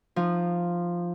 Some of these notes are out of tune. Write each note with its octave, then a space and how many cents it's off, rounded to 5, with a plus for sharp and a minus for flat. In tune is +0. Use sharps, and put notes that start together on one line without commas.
F3 +0 D#4 -25